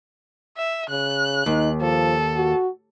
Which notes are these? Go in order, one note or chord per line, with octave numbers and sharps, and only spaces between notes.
E5
C#3 F#6
D#2 D#4
F3 A4
F#4